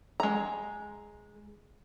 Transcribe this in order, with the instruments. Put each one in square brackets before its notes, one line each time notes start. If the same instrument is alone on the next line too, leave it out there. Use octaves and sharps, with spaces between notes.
[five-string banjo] G#3 A#5